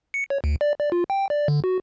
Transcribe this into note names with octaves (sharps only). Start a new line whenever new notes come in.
C#7
C#5
D2
D5
D5
F4
G5
D5
D3
F#4